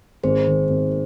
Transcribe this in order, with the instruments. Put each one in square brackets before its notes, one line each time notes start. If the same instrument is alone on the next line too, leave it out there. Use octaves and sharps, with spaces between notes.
[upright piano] G#1 [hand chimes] G#4 C5
[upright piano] D#3
G#1